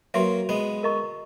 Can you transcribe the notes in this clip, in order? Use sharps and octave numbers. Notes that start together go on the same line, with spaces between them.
F#3 A#3 F#4 B4 E5
G#3 B3
A#4 D#5 A#5 C#6